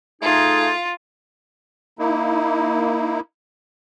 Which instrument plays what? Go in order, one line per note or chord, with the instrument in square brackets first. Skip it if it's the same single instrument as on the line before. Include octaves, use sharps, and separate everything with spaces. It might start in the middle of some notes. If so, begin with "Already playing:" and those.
[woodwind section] A3 D#4 G#4 [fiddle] F4
[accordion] A#3 D#4 E4